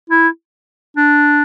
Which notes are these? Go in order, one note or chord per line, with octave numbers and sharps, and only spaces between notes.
E4
D4